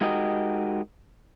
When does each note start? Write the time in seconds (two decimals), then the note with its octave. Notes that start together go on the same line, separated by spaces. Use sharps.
0.01 G#3 D#4 F#4 G4 A#4 D#5